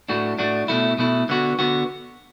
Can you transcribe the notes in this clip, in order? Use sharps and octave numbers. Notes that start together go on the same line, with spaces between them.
A2 A3 D4 F#4
A2 A3 D4 F#4
B2 A3 E4
B2 A3 E4
D3 B3 F#4
D3 B3 F#4